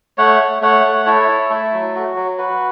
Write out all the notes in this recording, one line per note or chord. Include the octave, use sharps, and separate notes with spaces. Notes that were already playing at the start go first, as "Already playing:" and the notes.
A3 C#5 F#5
A3
A3 C#5 F#5
A3
E4 A4 C#5
E4
A3 A4
F#3
F#4
F#3
F#4 B4